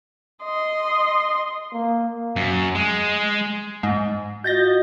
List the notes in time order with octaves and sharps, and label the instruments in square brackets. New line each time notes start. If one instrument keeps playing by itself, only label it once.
[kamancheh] D#5 C6
[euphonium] A#3
[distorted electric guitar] F#2
G#3
[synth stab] G#2
[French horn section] F4 F#4 D#5 [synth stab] G6 A6 A#6